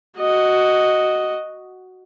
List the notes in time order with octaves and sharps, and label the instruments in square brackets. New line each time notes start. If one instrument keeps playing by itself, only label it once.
[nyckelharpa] F#4 D#5